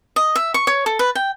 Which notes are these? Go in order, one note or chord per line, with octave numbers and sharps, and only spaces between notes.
D#5
E5
C#6
C#5
A4
B4
G5